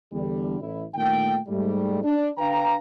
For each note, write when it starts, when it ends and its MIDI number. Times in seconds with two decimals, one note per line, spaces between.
0.13 0.60 40
0.13 0.60 50
0.13 0.60 55
0.60 0.83 33
0.60 0.83 64
0.94 1.36 31
0.94 1.36 46
0.94 1.36 51
0.94 1.36 57
0.94 1.36 79
1.48 2.02 44
1.48 2.02 55
1.48 2.02 57
2.03 2.30 62
2.38 2.76 50
2.38 2.76 62
2.38 2.76 71
2.38 2.76 77
2.38 2.76 79
2.38 2.76 82